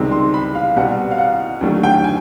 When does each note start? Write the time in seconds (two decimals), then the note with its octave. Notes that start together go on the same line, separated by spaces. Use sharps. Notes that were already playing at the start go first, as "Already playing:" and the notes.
Already playing: C#2 C3 D#3 G3 C4
0.12 C6
0.34 B5
0.55 F5
0.76 C2 B2 G3 C4 F#5
1.11 F5
1.18 F#5
1.61 D#2 D3 F#3 A3
1.83 G5
2.04 G#5